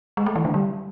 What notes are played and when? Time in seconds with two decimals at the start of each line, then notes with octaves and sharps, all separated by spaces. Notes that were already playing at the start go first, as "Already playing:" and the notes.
0.17 G#3
0.26 A3
0.36 E3
0.45 D3
0.54 G3